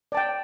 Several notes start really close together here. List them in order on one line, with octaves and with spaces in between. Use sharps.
D5 A5 G5